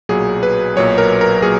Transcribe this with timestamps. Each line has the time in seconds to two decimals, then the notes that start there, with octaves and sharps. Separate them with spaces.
0.09 B1 A#2 F#3 G#4
0.43 B4
0.76 B1 A#2 F#3 C#5
0.98 A#4
1.21 A#4
1.42 A#2 F#3 G#4